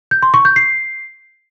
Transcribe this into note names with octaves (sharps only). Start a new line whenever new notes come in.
G6
C6
C#6
G6
C7